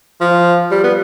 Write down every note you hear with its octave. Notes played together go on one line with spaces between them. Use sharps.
F3
G3
B3